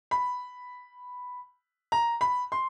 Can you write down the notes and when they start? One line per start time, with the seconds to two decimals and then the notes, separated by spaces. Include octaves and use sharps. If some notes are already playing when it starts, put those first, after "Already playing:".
0.11 B5
1.92 A#5
2.21 B5
2.52 C6